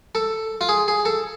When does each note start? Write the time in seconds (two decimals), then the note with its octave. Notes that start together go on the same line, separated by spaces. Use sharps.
0.15 A4
0.61 F4
0.69 G#4
0.88 G#4
1.05 A4